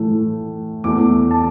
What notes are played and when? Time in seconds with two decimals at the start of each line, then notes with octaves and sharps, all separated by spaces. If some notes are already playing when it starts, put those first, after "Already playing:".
Already playing: A2 E3 A3
0.84 E2 E3 A3 D6
1.31 A5